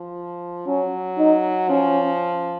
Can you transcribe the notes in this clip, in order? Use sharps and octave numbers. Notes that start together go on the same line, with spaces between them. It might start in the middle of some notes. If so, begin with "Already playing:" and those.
Already playing: F3
F#3 C#4
D#4
F3 C#4